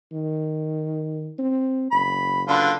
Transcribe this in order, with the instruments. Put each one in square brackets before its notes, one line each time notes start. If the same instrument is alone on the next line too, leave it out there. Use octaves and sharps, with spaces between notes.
[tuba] D#3
C4
[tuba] F#1 [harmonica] B5
[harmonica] D3 F4 B4